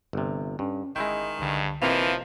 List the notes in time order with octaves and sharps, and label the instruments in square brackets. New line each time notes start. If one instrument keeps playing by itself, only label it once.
[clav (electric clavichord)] G1 C3
[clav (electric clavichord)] G2 [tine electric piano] C#4
[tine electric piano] G1 [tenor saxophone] D#3 [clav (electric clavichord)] G#3 E4 G5
[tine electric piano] C2 D3 [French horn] G2
[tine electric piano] G1 C4 F5 [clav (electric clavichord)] C3 A#3 D#5 [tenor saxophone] E3 [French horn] F3